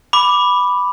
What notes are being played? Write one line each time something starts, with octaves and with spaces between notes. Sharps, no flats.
B5 D6